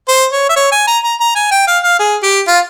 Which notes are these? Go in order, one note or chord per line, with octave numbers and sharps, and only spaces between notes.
C5
C#5
E5
C#5
G#5
A#5
A#5
A#5
G#5
G5
F5
F5
G#4
G4
F4